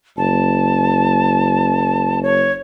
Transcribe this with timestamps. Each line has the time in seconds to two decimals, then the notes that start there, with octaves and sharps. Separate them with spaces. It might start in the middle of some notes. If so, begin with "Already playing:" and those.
0.17 F#1 A5
2.23 C#5